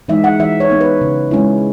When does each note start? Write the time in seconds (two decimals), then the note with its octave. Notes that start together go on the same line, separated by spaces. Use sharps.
0.08 E3 G#3 D#4 E5
0.24 F#5
0.39 E3 E5
0.60 C#5
0.70 B3 D#4
0.81 B4
1.01 C#3
1.31 G#3 C#4 E4